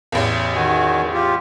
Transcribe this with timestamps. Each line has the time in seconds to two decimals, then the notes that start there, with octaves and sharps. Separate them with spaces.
0.12 A1 E2
0.56 D#3 F#4 G#5
1.13 F4 G4